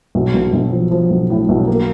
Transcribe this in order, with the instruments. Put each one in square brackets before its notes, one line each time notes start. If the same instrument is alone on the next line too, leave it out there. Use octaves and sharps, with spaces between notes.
[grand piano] B1
B1
B1
F3
F3
B1
A2
B1
A#3